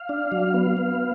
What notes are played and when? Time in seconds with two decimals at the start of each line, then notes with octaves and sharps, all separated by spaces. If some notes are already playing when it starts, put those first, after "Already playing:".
Already playing: F5
0.09 D4
0.32 F#3
0.54 B3
0.77 B3